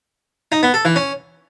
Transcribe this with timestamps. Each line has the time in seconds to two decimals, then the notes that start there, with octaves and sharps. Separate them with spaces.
0.52 D#4
0.63 B3
0.74 A4
0.85 E3
0.96 C#4